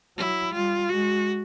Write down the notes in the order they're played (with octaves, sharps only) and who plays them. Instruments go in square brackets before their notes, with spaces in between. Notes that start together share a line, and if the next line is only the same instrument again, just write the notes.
[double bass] F#3 [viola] E4
[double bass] G3 [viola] F4
[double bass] G#3 [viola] F#4